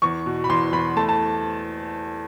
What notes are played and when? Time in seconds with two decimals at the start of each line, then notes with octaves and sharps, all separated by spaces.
0.02 E2 C#6
0.26 B2
0.44 B5
0.50 E2 C6
0.73 E2 B5
0.97 A3 A5
1.09 A5